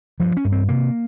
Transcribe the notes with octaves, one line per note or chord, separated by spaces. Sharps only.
G2 F3
C#4
G2
C4
C3 A#3